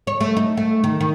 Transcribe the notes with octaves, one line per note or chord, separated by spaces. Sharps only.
C#5
A3
D#4
A3
D#3
D#3